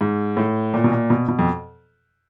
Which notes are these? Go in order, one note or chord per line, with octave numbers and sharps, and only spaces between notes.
G#2
A2
A#2
B2
A#2
B2
B2
F2